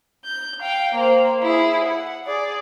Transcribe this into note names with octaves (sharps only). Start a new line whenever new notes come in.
G6
F5 G5
A#3 C5
E4 G#4
F#5
G#4 D5